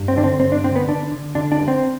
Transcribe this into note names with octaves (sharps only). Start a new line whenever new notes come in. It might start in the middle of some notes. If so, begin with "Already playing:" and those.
Already playing: G2
C4
D3 D4
C4
G2 C4
D4
D3 C4
B3
D3 D4
D3
D3 D4
D4
G2
C4